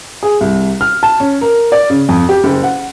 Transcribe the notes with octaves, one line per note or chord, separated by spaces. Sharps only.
G#4
C2
F6
A5
C#4
A#4
D5
C#3
F2
G4
F#1
F#5